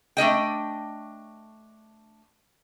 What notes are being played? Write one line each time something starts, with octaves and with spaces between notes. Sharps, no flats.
A3 D4 D#5 G5